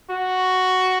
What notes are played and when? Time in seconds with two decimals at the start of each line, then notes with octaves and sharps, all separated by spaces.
0.10 F#4